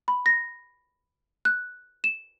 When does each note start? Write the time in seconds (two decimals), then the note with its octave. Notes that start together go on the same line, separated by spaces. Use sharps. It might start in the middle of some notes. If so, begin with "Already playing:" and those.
0.08 B5
0.26 A#6
1.45 F#6
2.04 E7